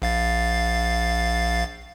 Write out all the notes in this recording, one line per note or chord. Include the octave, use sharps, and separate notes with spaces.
A#1 F5 A6